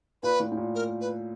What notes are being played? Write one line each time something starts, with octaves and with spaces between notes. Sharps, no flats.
A#2 B4
A2
A2
A#2
A#4
B4